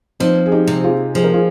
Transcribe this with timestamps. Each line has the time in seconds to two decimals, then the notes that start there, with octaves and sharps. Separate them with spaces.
0.20 F3 C4 D#4
0.46 G#4
0.52 D#4 G4
0.67 C3
0.83 F4 G#4
1.15 F3 G#4
1.24 A#4
1.33 F4 G#4